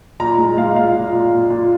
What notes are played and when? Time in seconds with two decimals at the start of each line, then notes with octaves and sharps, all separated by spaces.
0.20 A#2 A#5
0.38 G#3
0.57 G#3 F5
0.75 A#2 F5
0.95 A#2
1.13 A#2
1.32 A#2
1.50 A#2